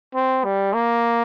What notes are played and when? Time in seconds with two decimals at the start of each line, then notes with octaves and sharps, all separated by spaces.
0.15 C4
0.44 G3
0.74 A#3